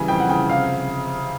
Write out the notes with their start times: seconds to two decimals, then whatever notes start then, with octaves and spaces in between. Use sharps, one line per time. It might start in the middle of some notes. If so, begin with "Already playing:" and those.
Already playing: C#3 E3 G3 G#5
0.08 F2 G5
0.20 F#5
0.29 C#3 G5
0.49 C3 F5